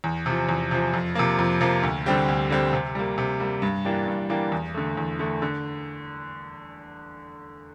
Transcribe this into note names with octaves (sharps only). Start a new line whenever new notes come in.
E2
C3 F3
E2
C3 F3
F2
C3 F3 A#3
F2
C3 F3 A#3
D2
D3 G3 C4 G4
D2
D3 G3 C4 G4
C3
G3 A#3
C3
G3 A#3
G2
E3 A#3 D4 G4
G2
E3 A#3 D4 G4
E2
D3 A3
E2
D3 A3
D3